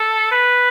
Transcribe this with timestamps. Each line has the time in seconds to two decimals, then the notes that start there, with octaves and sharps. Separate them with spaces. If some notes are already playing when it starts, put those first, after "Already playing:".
Already playing: A4
0.31 B4